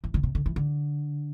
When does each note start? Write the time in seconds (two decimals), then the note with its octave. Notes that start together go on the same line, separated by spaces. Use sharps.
0.04 E3
0.14 D3
0.23 C3
0.35 D3
0.46 E3
0.56 D3